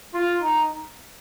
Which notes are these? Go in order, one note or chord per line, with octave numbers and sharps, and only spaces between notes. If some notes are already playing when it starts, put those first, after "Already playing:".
F4
D#4